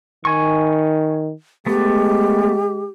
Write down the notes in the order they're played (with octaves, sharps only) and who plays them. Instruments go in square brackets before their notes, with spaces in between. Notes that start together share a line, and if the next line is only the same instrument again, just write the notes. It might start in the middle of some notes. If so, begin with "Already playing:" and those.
[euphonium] D#3 [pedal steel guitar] G#5 C#6
[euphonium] G#3 [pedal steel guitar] A3 B3 [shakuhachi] G4